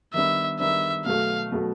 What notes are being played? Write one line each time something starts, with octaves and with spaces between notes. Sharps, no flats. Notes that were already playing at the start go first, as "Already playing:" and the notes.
D#3 G3 B3 D4 E5
D#3 G3 B3 D4 E5
B2 F#3 A3 F5
B2 F#3 A3